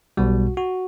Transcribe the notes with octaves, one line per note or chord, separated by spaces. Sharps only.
B1 B2 G3 F#4
F#4